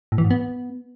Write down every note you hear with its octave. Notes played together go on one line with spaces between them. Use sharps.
A2
E3
G#2
B3